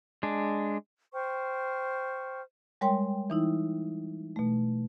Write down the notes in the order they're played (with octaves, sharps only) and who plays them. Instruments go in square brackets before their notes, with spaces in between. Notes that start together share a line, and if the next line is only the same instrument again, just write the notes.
[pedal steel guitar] G#3 D4
[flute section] C5 G5 C#6 F6
[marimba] G3 G#3 A#4 C#5 G5 C6
E3 D#4 E4
B2 A3